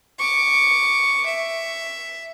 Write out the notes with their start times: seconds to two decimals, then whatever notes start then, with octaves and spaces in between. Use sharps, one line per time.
0.19 C#6 D6
1.26 E5